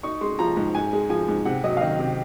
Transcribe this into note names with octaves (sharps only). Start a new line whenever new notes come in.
D#4 C#6
G#3 C6
F3 A#5
G#2
G#2 G#5
G#3
F3 G#5
G#2
C3 F#5
F#3 D#5
F5
D#3 D#5
C3